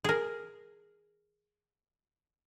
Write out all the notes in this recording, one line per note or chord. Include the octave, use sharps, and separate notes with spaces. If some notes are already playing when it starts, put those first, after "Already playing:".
G#4 A#4